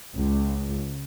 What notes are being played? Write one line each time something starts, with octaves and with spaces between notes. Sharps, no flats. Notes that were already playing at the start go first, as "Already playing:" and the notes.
C#2